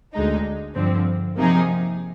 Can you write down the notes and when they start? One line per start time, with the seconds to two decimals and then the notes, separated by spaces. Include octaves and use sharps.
0.14 D2 D3 G#3 D#4
0.75 G2 D3 F3 C4
1.36 C3 F3 A#3 D#4 G#4